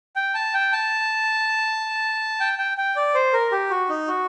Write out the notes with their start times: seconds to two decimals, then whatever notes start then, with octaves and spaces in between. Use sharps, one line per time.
0.16 G5
0.34 A5
0.54 G5
0.72 A5
2.40 G5
2.58 G5
2.77 G5
2.96 D5
3.15 C5
3.33 A#4
3.52 G4
3.70 F#4
3.89 D#4
4.08 F#4